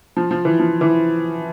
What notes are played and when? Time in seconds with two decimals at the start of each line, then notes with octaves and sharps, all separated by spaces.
0.17 F3
0.31 F3
0.45 E3
0.59 F3
0.81 E3